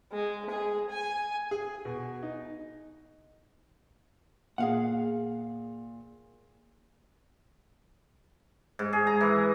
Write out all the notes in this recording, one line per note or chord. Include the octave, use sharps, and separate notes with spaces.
G#3
G#4
G#5
G#4
B2
D#4
A#2 G#4 F5 F#5
G#2
G#4
A#5
E3